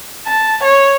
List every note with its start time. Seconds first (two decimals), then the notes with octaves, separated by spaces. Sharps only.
0.25 A5
0.63 C#5